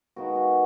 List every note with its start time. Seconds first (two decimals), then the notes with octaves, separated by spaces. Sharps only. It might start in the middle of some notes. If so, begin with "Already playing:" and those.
0.16 D#3 G#3 B3 D#4 F#4
0.35 F#4